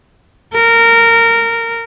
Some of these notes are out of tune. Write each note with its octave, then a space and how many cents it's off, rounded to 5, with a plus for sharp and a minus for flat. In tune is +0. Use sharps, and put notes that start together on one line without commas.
A#4 -15